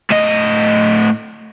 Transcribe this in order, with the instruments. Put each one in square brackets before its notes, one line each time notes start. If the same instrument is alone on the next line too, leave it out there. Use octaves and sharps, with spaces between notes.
[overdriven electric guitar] A2 D#5